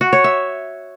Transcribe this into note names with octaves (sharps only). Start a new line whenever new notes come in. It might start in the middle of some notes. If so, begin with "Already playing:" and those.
F#4
C#5
E5